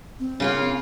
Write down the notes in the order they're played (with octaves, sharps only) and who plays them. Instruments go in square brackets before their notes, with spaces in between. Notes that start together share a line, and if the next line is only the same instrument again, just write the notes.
[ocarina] C4
[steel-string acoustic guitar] C#3 A#3 F4